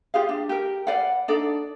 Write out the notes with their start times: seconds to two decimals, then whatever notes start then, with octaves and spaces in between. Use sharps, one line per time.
0.14 F4 G4 G#4 F5
0.29 D4
0.49 G4 A#4
0.87 B4 D5 F5 F#5
1.28 D4 D#4 A4 D5